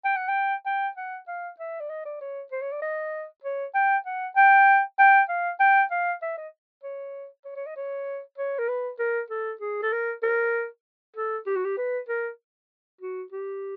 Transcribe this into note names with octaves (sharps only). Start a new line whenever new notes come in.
G5
F#5
G5
G5
F#5
F5
E5
D5
D#5
D5
C#5
C5
C#5
D5
D#5
C#5
G5
F#5
G5
G5
F5
G5
F5
E5
D#5
C#5
C#5
C#5
D#5
C#5
C#5
A#4
B4
A#4
A4
G#4
A4
A#4
A#4
A4
G4
F#4
G4
B4
A#4
F#4
G4